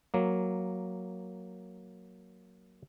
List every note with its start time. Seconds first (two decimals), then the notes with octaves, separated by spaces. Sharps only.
0.14 F#3 A#3